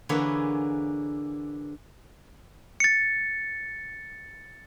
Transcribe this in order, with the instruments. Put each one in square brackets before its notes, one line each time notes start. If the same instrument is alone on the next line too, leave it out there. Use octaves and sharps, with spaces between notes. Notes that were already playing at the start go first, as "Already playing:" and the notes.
[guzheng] D3 E3 A#3 G#4 B4 C#5
[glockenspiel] A6 C#7